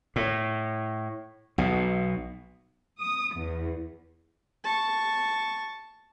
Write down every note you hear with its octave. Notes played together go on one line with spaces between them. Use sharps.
A2
B1 B2
D#6
E2
A5 C#6